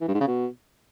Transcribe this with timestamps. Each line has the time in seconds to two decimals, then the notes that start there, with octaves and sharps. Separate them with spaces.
0.01 E3
0.08 G2
0.14 G#2
0.21 C#3
0.27 B2